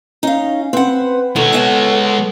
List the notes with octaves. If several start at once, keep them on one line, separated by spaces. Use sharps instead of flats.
C#4 D#4 F5
C4 B4 F#5
B2 D#3 G#3 A4 C#5 F#5
B3 F5 A5